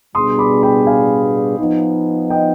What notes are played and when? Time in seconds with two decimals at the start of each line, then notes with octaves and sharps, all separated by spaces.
0.15 B2 G3 B3 D4 G#4 C6 D#6
0.38 B5 D6
0.63 G5 B5
0.87 F5 G#5
1.59 F3 B3 D#4
2.30 D#5 G5